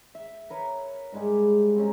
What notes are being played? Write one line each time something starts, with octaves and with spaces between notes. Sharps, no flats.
E5
A#4 B4 C#5
G#2 G3 G#3 G4
C4 C#4 D#4